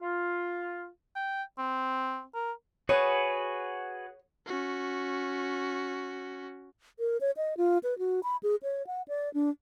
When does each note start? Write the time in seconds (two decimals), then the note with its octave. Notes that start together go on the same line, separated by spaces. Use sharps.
0.01 F4
1.16 G5
1.58 C4
2.34 A#4
2.89 F#4 G#4 B4 C#5
4.46 C#4 F#4
6.99 A#4
7.21 C#5
7.37 D#5
7.57 F4
7.83 B4
7.99 F#4
8.23 B5
8.43 G#4
8.63 C#5
8.87 F#5
9.08 D5
9.34 D4